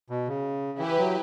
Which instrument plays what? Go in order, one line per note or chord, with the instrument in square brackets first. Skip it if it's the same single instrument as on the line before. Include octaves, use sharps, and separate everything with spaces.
[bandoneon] B2
C#3
[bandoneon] E3 [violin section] E4 G4 B4
[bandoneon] F#3